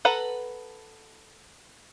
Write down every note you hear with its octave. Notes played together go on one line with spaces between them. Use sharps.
A4 B4 F#5 A#5